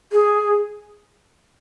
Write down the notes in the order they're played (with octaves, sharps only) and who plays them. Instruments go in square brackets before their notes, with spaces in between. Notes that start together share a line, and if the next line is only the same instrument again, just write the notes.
[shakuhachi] G#4